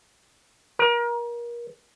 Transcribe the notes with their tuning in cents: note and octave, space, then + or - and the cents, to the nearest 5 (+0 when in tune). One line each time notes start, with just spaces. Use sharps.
A#4 +30